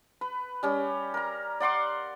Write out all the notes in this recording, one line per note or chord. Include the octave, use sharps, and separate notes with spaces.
B4
G3 C#4 G4
A#4 A#5
D5 F#5 C6 D6